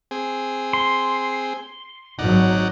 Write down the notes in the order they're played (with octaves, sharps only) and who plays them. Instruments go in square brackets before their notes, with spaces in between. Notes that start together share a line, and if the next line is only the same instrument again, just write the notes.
[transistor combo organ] C4 G#4
[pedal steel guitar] C6
[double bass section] G#1 F#3 [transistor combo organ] D#4 D5 F#5